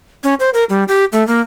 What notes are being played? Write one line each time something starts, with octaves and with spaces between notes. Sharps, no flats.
C#4
C5
A#4
G3
G4
A3
A#3